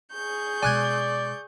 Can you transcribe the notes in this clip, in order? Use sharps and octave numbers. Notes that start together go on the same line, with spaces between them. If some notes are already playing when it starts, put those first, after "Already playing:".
G#4 C#6 G6
B2 G#3 D5 G#5 F#6 G#6